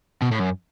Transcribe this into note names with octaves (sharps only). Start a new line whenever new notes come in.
B2
A2
F#2